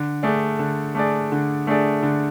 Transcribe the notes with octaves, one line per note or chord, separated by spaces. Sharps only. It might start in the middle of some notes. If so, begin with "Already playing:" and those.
Already playing: D3
A3 D4 G#4 D5
D3
A3 D4 G#4 D5
D3
A3 D4 G#4 D5
D3